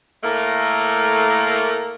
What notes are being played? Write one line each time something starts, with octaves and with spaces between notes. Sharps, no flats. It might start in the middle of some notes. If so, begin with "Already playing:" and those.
A2 A3 A#3